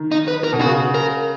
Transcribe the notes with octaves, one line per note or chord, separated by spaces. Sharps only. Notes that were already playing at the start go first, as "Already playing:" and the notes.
Already playing: D#3
D#4
B4
A#4
B2
C#3 F#4
A#4